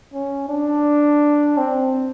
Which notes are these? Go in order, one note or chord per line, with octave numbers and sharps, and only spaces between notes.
C#4
D4
C4